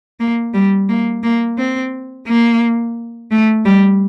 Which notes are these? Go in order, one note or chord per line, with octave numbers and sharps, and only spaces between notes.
A#3
G3
A#3
A#3
C4
A#3
A3
G3